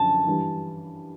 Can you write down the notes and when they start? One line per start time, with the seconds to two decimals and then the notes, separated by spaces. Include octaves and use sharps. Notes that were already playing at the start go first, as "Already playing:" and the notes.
Already playing: F#2 D3 F3 C#4 A5
0.26 G2 E3 G3